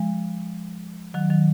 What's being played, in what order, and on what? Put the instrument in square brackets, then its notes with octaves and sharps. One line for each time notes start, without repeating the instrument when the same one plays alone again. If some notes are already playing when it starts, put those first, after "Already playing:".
Already playing: [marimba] F3 G#3
D#3 F#3
D#3 F#3